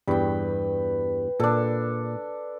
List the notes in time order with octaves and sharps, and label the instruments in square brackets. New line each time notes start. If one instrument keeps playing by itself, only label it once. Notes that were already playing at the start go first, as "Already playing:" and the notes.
[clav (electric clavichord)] E2 G2 G3 [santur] B4 G5
[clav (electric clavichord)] A#2 [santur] D4 A4